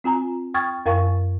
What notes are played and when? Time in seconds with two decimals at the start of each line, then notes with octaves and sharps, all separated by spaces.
0.04 C4 F4 G#5 A#5
0.54 G5 C#6 D#6 F6 G#6 A6
0.86 F#2 A#4 F5 G#5 C#6